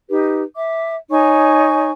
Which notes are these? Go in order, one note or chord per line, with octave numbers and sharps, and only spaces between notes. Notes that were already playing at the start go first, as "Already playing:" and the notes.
D#4 G4 B4
E5 D6
D#4 C#5 G#5 C#6